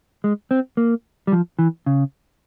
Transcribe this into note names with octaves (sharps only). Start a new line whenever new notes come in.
G#3
C4
A#3
G3
F3
E3
C#3